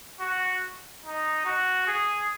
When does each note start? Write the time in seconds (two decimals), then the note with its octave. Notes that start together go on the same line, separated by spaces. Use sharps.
0.20 F#4
1.04 D#4
1.46 F#4
1.87 G#4